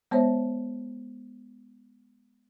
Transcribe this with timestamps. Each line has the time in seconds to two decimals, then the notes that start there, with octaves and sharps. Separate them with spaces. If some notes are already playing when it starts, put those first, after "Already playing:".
0.11 G#3 B3 C5 C#5 E5